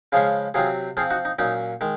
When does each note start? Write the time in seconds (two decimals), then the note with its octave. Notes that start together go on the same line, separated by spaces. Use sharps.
0.12 C#3 F3 G#3 C#4 F4 G#4
0.54 C3 F#3 C4 F4 G#4
0.97 F3 C4 F4 G#4
1.10 D#4 F#4
1.25 D#4
1.39 A#2 F#3 C#4 D#4
1.81 D#3 G#3